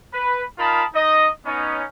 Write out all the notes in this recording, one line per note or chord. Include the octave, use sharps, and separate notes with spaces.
B4
D#4 F4 A#4 A5 B5 D#6
D#4 D#5
B3 C#4 D#4